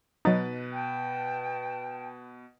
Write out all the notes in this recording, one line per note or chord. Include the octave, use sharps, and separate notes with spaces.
B2 F#3 D#4 B4 A6
G5 A5